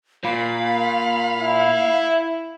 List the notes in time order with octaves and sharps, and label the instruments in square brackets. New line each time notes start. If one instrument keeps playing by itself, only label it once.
[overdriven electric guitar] A#2 [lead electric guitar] F5 [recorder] B5
[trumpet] E4